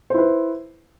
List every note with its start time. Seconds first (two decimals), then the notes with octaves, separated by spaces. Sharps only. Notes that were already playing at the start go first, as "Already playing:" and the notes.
0.10 C5
0.14 E4
0.18 B4